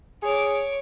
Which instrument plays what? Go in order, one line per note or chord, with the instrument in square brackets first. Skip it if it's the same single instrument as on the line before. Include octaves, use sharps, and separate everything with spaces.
[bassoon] G#4 [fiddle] C#5 D6